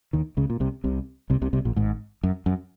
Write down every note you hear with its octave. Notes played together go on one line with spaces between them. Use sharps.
D#2 D#3
C#2 C#3
A#2
C2 C3
C2 C3
C2 C3
C2 C3
C2 C3
A#1 A#2
G#1 G#2
F#2
F#2